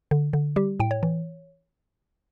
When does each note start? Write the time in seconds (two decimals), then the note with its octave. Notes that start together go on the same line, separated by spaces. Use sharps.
0.11 D3
0.33 D3
0.56 G3 G4
0.80 A2 G5
0.91 C#5
1.03 E3